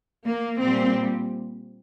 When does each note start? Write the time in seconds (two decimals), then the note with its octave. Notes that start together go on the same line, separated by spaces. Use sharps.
0.25 A#3
0.58 A#2 G3 C4